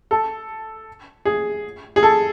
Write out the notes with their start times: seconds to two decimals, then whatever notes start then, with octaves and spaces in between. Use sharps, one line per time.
0.11 A4
1.25 G#4
1.96 G#4
2.03 A4